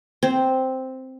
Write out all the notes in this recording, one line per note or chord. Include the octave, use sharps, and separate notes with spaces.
C4